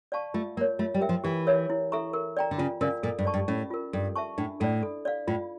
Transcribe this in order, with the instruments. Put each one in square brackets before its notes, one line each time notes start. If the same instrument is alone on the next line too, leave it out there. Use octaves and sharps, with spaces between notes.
[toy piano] D5 F5 A5 C#6
[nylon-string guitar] A3 [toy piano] F4
[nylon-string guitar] A#3 [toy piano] A#4
[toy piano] C#5
[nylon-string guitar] A3 [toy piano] F4
[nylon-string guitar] G3
[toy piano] A#4 E5 G5
[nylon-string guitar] F3
[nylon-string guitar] E3 [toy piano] G4
[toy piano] A#4 C#5 E5
E4
A4 E5 A#5 C#6
A#4
D5 G5 A#5
[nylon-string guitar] D3
[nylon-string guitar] C#3 [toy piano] F4
[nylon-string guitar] C#3 [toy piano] A#4 D5 F5
[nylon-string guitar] A#2 [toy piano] A4
[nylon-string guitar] G2
[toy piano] D5 A5 C#6
[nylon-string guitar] G2
[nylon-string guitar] A2 [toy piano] C#4
[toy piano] F4 A#4
[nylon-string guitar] G2 [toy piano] A4
[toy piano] E5 A5 C#6
[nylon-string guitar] A2 [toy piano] D4
[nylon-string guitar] A2 [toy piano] A4 D5
[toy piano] A4
D5 F5
[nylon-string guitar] A2 [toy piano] F4